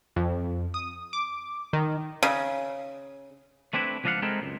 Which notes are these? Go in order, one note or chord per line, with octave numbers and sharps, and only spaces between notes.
F2
D#6
D6
D#3
C#3
A3 C4 D4 E4 G#4 B4
C#2 F3 D4 D#5 F5 F#5
G#3 C4 D#4 E4 A4 A#4
C#2 F#2